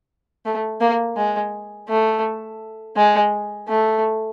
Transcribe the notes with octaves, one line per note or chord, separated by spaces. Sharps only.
A3
A#3
G#3
A3
G#3
A3